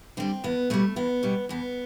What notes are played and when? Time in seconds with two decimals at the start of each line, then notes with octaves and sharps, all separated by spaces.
0.17 D3 G3 C4
0.44 E2 B3
0.70 B2 G3 A3
0.96 E2 B3
1.23 B2 G3
1.49 E2 B3